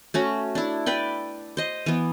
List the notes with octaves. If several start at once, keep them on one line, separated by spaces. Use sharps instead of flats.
A3 C#4 F#4
D4 E4
B4 D5 G5
C5 D#5
E3 B3